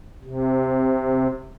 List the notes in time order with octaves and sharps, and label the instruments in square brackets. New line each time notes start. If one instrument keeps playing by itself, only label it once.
[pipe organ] C3